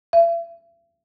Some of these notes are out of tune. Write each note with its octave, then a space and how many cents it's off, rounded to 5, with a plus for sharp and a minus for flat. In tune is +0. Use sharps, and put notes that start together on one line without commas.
E5 +40